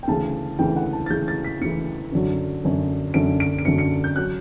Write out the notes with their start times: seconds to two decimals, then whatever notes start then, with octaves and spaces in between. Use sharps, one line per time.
0.03 G5
0.08 D2 C#3 E3 A5
0.59 D2 C#3 E3 G5
0.76 F#5
0.93 A5
1.06 A6
1.10 D2 C#3 E3 G6
1.28 A6
1.44 B6
1.61 D2 C#3 E3 C#7
2.12 F#2 D3 F#3
2.64 F#2 D3 F#3
3.14 F#2 D3 F#3 D7
3.40 D7
3.59 D7
3.65 F#2 D3 F#3 C#7
3.78 C#7
4.04 G6
4.16 F#3 F#6